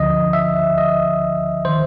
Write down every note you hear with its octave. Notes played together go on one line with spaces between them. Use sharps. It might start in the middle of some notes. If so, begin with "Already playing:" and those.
Already playing: D2 D3 F3 D#5
E5
D#5
D#3 C5